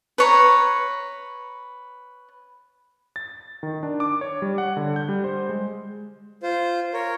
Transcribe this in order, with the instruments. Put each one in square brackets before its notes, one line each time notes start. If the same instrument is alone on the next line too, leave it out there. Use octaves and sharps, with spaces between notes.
[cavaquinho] B4 C#5 A#5
[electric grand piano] A6
D#3
D4
D6
C#5
G3
F#5
D3
G6
G3
C5
G#3
[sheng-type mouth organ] F4 C5
A#4 C#5